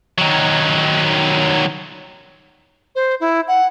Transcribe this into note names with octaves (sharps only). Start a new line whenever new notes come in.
D#3 F#3
C5
E4
F#5